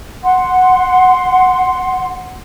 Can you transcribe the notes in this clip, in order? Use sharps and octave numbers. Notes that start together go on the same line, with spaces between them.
F#5 C6